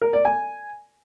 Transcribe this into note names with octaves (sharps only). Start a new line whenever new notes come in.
A#4
D5
G#5